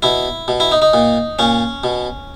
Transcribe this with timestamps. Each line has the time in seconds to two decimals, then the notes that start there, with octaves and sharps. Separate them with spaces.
0.02 B2 E4
0.48 B2
0.60 E4
0.72 D#4
0.82 D#4
0.94 A#2
1.39 A#2 C#4
1.84 B2